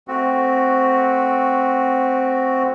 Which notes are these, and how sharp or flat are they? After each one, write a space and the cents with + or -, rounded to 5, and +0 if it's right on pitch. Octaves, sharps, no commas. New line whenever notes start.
A3 +0 C4 +0 F#4 +0